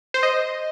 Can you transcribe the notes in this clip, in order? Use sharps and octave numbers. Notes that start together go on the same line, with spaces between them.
C5
D#5